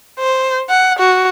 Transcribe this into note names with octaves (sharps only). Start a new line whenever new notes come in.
C5
F#5
F#4